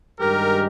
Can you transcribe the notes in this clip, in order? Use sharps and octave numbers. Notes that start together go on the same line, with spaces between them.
G2 D#3 G#3 G4 A#4